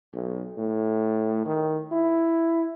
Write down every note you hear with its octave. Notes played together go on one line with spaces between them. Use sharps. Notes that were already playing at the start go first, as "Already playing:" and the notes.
B1
A2
D#3
E4